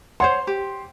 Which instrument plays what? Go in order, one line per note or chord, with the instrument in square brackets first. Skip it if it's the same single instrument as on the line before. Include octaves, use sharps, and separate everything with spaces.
[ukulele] C5 C#5 F#5 [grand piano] C6
[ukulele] G4